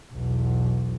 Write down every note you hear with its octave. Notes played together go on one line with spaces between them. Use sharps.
B1 E2